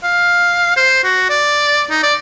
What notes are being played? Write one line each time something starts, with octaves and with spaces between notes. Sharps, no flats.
F5
C5
F#4
D5
D#4
D5